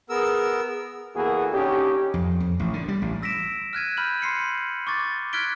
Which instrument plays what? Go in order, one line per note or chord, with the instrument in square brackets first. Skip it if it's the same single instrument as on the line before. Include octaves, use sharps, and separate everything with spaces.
[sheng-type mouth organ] B3 A#4 E6 [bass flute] G#4
[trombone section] E2 A#3 B3 F#4 G#4 A4
D3 C#4 D#4 G4
[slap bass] F2
F2
A1
D3
G3
A1
[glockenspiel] E6 A#6 B6 D7 E7
F6 F#6 G#6 D#7
B5 F6 G6 F#7
C6 C7 C#7
C#6 D6 A6
F6 F#6 G#6 B6 D7 G7